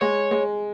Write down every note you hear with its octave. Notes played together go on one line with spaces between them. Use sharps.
G#3 C#5
G#3